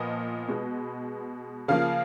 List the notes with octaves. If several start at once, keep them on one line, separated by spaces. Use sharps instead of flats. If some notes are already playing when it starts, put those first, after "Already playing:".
Already playing: A#2 F3 B3 D#5
B2 G#3 B3
C#3 F3 A#3 F5